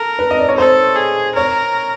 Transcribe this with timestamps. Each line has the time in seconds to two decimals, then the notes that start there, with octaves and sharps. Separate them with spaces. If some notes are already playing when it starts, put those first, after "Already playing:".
Already playing: A4 A#4
0.19 B4
0.31 D#5
0.40 D5
0.48 C#5
0.58 A4 C5
0.96 G#4
1.35 A#4 C#5